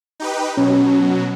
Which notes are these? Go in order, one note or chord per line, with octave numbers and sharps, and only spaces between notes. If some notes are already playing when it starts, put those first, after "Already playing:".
D#4 G4 B4
B2 F#3 C#4